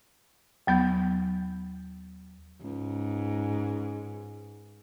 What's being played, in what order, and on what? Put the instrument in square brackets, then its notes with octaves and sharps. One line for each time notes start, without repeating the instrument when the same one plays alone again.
[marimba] D#2 F#3 B3 G6
[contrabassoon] C#2 [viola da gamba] G#2